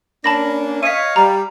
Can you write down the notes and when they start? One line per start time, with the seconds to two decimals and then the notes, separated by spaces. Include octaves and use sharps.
0.24 A#3 C#4 D4 A5 B5 A#6
0.83 C#5 D#5 F5 B6 D#7
1.16 G3 A#5